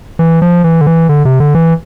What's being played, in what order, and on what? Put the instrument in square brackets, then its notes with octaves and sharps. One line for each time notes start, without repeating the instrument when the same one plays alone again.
[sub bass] E3
F3
E3
D3
E3
D3
C3
D3
E3